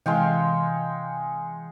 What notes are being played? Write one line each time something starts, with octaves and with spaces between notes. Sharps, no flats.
C3 E3 G#3 F5 G5 C#7